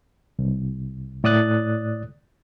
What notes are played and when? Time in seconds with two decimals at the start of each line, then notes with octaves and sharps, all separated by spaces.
0.39 C2
1.24 A2 D5 D#6 F#6 A6